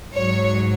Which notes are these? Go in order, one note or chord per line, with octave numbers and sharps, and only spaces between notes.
G#2 F#3 C#5